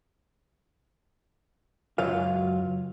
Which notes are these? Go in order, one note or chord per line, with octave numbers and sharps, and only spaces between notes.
C#2 F#2 F#3 F4 F5